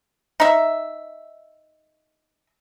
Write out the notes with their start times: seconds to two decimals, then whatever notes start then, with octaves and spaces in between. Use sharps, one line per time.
0.40 D#4 E5